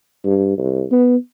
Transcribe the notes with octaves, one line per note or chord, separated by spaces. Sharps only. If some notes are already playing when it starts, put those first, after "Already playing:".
G2
C2
B3